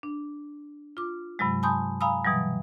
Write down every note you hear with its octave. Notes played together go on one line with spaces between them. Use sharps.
D4
F4 D6
G2 C3 F#3 G#3
G#5 A5 B5 C6 D#6 G6
F5 G#5 A#5 B5 D#6 E6
B2 E3 F#3 G3